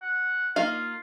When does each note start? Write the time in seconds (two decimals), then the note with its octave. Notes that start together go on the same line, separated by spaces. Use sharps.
0.02 F#5
0.56 A#3 D#4 F4 F5